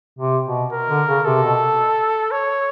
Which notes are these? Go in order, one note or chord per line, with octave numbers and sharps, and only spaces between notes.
C3
B2
A#4
D3
C#3
C3 A4
B2
C#5